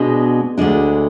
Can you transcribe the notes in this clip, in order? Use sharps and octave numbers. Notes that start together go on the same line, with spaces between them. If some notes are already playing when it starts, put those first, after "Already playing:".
Already playing: B2 G#3 B3 D4
D2 D3 G#3 D4